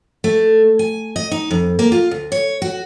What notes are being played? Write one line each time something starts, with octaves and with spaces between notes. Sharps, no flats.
A3
G#5
D#5
D#4
F2
A#3
F4
D2
C#5
F#4